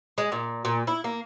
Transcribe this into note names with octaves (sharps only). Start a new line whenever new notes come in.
G#3
A#2
A#2
E4
A#3